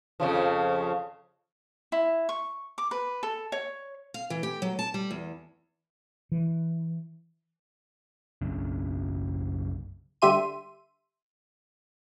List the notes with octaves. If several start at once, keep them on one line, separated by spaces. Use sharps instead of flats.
F2 C#3 F3
E4
C#6
D6
B4
A4
C#5
F5
E3
G4
F#3
A5
G3
E2
E3
B1 F#2 C#3 D4
D3 G3 G4 E5 C6 D#7